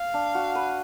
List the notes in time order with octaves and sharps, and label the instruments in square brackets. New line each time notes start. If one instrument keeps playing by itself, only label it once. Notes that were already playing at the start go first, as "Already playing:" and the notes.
Already playing: [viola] F5
[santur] D4
F#4
B4